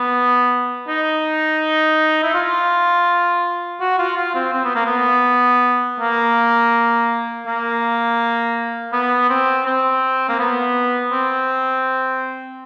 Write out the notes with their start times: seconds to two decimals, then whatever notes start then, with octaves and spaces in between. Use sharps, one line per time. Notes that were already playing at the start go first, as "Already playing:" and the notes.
Already playing: B3
0.88 D#4
2.23 E4
2.34 F4
3.81 F#4
3.99 F4
4.17 F4
4.35 C4
4.53 C4
4.65 B3
4.75 A#3
4.85 B3
6.00 A#3
7.47 A#3
8.93 B3
9.30 C4
9.66 C4
10.29 A#3
10.39 B3
11.12 C4